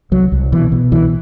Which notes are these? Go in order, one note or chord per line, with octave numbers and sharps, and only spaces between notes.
C2 F#3
C2
B2 E3
B2
C2 E3